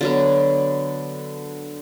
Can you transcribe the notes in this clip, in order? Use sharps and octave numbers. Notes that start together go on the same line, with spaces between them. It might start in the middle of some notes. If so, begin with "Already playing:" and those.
D3 F#3 B3